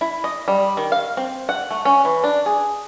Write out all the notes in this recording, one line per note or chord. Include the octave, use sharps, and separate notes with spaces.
E4
D#5
G3
D#3
F5
C4
F#5
A3
C#4
E3
D4
G#4